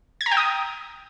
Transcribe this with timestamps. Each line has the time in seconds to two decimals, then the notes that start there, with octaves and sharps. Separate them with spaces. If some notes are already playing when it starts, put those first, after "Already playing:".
0.21 G#6
0.26 A#5
0.31 G5
0.37 D#6